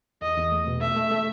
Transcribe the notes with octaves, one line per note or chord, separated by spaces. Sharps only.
E2 D#5
E2
A3
B2
A3 E5
A3
A3